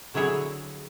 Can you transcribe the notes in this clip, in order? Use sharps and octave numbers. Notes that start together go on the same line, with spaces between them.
D3 F#3 E4 G#4 C#5